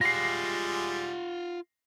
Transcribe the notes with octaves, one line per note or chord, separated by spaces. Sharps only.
G3 G#3 F4 F#5 A#6 C7